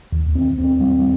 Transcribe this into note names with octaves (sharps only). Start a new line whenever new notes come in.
D#2
C4
C4
G3